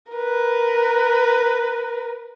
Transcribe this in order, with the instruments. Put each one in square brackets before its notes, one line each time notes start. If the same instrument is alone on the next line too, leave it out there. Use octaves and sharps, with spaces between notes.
[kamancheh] A#4 B4